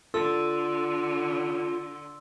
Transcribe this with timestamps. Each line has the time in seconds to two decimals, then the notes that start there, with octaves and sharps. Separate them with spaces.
0.14 D3 F4 A4 C6 E6